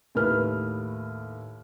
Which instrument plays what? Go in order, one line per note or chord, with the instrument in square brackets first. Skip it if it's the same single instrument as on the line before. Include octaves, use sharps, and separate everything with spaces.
[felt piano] D#2 A2 B4 F6